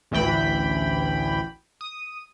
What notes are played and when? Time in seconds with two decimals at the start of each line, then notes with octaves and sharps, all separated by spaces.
0.11 A1 D2 E3 G5 B5
1.81 D#6